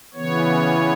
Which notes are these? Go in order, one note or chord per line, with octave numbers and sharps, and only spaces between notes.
C#3 E3 B3 C#5